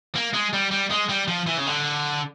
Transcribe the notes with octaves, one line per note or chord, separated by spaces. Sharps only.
A#3
G#3
G3
G3
G#3
G3
F3
E3
C#3
D3